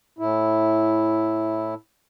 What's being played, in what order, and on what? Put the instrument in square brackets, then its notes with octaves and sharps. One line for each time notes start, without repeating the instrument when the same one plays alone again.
[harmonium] A2 E4